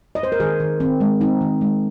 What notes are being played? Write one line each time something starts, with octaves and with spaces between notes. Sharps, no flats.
D#5
C5
A#4
D#3 G#4
D#3
D#3 C4
G#3
C4 D#4
D#3
G#3